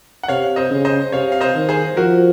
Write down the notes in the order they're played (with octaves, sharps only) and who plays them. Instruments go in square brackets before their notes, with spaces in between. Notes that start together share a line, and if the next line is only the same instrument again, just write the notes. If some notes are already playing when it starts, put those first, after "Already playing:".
[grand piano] F#5
[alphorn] C3 [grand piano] C#5 F5
[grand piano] C5 D#5
[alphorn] C#3
[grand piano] C5 D#5
[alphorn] C3 [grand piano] C#5 F5
[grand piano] F5
C5 D#5
[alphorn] D#3
[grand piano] G#4 C5
[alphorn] F3 [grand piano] F#4 A#4